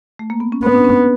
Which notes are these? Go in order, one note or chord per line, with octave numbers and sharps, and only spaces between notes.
A3
A#3
B3
C#4
B3 C4
D4
C#4